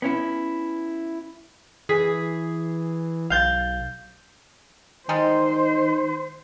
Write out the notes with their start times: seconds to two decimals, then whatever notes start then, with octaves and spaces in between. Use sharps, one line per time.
0.02 B3 C#4 E4
1.89 E3 G#4 B6
3.30 B1 F5 G6 A6
5.09 D#3 G3 G#3 D#4 C5